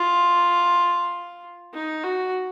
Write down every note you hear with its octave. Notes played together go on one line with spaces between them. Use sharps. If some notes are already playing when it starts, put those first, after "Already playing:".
Already playing: F4
D#4
F#4